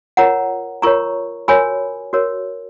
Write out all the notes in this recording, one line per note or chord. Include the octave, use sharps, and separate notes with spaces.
F4 A#4 C#5 F#5 A#5
F4 A#4 C#5 A#5 C#6
F#4 A#4 C#5 G#5 B5
F#4 A#4 C#5